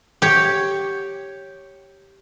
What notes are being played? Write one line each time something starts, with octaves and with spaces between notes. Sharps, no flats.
G4 C#5